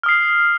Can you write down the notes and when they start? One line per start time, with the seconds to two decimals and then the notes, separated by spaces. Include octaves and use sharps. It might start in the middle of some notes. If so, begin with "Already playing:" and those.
0.03 F6
0.06 D#6
0.09 C7